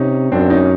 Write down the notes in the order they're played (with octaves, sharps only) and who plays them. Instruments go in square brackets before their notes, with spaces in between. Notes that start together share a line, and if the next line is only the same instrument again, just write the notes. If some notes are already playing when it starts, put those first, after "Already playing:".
Already playing: [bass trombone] C3 [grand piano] C#4 D#4
[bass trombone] F#2 [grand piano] C4 D4
[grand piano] C#4 D#4